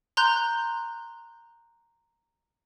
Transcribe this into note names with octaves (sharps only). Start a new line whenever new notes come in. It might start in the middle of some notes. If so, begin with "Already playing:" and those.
A#5 C6 F#6 G6